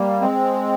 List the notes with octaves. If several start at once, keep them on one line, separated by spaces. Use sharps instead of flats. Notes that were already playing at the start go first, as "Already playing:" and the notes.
Already playing: G3 A#3
G#3 C4